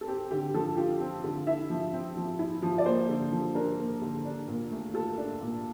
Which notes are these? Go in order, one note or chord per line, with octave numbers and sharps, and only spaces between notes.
A4
C4 G4
D3 G4
F3 A4
F4 G4
C4
D3
E4 E5
F3
C4
F3
E4
F3
D5
A#3 C5
D3
F3
D4 A#4
A#3
D3
D4
A#2
A3
F4 A4
D4
A#2